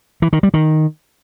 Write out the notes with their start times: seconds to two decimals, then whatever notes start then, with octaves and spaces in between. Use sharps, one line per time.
0.22 E3
0.33 D#3
0.43 G3
0.54 D#3